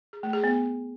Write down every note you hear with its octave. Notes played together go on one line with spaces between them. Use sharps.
G#4
A3
G#4
B3